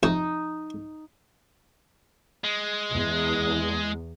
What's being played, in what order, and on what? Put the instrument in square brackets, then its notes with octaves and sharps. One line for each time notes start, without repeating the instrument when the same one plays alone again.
[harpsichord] F2 C3 C#6 [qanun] D#4
[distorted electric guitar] G#3
[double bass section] E2